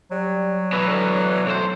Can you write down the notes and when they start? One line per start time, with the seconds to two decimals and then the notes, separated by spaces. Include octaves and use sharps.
0.11 F#3 G3
0.73 B2 E3 B4
0.87 D3
1.46 B1 A3 C5